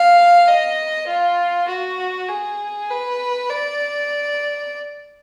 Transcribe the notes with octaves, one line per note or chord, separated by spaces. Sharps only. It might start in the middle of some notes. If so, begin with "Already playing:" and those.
Already playing: F5
D#5
F4
F#4
G#4
B4
D5